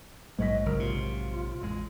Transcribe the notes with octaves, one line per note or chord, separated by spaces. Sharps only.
A#1 G#2 F#3 D#5 B6
F#1 A#4
C3 F4
A1 F2 G#3